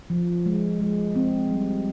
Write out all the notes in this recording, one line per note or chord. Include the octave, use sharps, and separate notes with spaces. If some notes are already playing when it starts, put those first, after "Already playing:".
F3
G#3
G#3
C4
G3